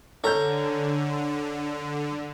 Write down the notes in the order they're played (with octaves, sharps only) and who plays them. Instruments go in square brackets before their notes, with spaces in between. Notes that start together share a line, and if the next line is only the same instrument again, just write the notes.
[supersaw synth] D3 [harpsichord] C#4 A#5 [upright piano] A4 G6